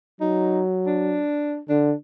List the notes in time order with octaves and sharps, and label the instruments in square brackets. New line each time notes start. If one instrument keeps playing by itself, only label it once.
[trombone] F#3 [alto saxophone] D#4
[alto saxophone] D4
[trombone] D3 [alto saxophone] D4